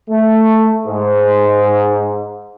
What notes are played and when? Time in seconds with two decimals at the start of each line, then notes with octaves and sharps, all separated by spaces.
0.10 A3
0.87 G#2